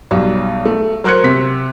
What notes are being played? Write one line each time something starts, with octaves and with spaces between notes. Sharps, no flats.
B1 F#3 G3
A3
F#3 A#4 C5 F#6 G#6 C#7
C3 C4 B6